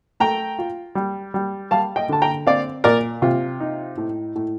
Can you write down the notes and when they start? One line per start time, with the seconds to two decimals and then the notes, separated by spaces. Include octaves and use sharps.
0.20 A3 G5 A#5
0.58 F4
0.95 G3
1.34 G3
1.71 G3 F5 A5
1.96 D#5 G5
2.09 D3 A5
2.22 G5 A#5
2.47 C4 D5 F5
2.84 A#2 A#4 D5
3.22 C3 F4
3.60 D#4
3.97 A2
4.35 A2